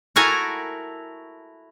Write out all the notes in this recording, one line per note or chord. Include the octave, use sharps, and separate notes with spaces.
E4 F#4 A4 A#4 G#5 A#5